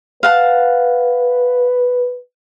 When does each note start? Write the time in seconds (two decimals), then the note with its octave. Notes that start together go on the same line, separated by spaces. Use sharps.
0.23 B4 F5 F#5 A5